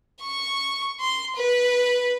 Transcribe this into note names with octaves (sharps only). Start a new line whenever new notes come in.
C#6
C6
B4